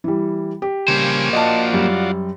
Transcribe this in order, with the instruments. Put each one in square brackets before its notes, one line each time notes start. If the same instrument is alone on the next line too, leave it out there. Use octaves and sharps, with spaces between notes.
[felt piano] E3 G3
G4
[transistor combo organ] C#3 G3 G#5 [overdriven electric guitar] A#3 C5
[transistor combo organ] F4 F#4 D5 [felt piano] D#5 A5
[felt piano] F#2 G3